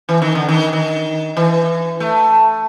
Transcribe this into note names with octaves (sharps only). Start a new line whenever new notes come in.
E3
D#3
D3
D#3
D#3
E3
A3